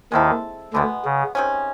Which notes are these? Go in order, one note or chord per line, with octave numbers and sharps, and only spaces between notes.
D#2 D#3 G#3 C4 E4 A4
D2 B2 D3 G#3 B3
C#3
C3 D#3 G#3 C#4